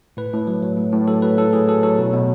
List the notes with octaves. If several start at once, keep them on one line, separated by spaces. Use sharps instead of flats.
A2 B4
A2
F#3
F#3
A2
A2
F#3 A4
F#3 B4
A2 A4
A2 G#4
F#3 A4
F#3 A4
B2
B2